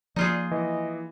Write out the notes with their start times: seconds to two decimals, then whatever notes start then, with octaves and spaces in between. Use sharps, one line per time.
0.16 F3 A#3 D#4 F4 G#4 D5
0.51 E3 D#5